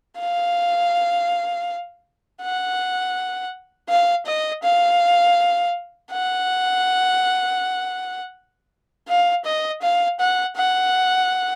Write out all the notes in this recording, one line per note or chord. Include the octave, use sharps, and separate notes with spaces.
F5
F#5
F5
D#5
F5
F#5
F5
D#5
F5
F#5
F#5